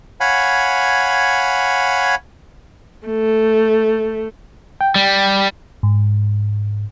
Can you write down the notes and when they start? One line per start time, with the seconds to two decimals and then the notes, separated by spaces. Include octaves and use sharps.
0.20 C#5 F5 F#5 G#5 B5
3.06 A3
4.81 G5
4.96 G3
5.83 G#2